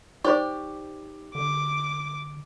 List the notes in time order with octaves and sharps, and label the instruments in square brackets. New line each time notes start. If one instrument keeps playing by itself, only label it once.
[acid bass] D#4 [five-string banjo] G4 D5 [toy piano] C5 C#6
[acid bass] D3 [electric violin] D6